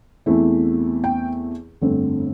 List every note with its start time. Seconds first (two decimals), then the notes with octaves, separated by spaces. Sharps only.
0.26 E2 E3 A3 C4 E4
1.04 G5
1.81 G1 F2 D3 A3 C4